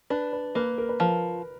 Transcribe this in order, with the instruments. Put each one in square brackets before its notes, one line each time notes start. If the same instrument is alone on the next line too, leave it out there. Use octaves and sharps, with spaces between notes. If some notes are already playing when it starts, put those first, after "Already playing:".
[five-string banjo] D4 [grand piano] B4
[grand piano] B4
[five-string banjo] A#3 [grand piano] B4
[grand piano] A#4
B4
[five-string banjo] F3 [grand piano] A#4